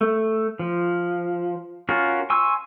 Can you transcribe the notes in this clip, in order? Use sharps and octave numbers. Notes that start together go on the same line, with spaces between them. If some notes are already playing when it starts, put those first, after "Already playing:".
A3
F3
C#4 F4 F#4 A#4
G#5 C6 C#6 E6